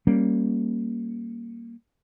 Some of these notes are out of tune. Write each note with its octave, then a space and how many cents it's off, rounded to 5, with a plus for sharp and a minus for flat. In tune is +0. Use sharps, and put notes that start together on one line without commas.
G3 +0 A#3 +0 C#4 -15